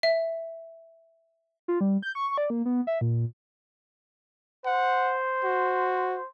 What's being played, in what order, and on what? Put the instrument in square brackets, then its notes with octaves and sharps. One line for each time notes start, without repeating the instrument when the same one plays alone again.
[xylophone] E5
[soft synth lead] F4
G3
G6
C#6
D5
A#3
B3
E5
A#2
[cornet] C5 [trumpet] F#5
[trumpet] F#4